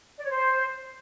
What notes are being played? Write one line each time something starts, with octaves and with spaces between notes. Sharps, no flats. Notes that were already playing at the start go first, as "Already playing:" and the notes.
D5
C#5
C5